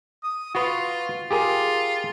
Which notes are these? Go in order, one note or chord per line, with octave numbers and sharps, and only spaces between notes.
D#6
F4 F#4 B4
F4 G4 G#4 A#4